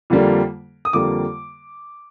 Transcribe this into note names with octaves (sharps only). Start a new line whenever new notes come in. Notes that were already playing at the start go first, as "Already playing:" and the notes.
F2 D3 G3 A#3
D#6
F2 D3 G3 A#3 D6